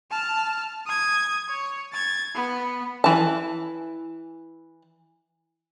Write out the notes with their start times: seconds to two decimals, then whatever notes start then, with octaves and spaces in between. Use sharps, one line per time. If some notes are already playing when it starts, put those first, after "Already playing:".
0.11 A5 F6
0.86 D#6 G#6
1.49 C#5
1.93 G#6 A6
2.35 B3
3.04 E3 A5